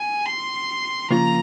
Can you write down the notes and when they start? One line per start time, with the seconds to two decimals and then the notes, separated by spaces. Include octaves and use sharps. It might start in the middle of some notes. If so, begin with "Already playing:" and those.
Already playing: G#5
0.26 C6
1.11 C#3 F3 A#3 F4 A#4 A#5